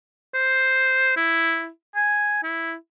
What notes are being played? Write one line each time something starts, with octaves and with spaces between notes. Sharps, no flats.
C5
E4
G#5
E4